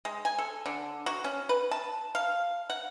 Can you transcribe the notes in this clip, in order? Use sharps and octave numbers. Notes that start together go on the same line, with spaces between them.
G#3
G#5
A4
D3
F#4
C#4
B4
A5
F5
F#5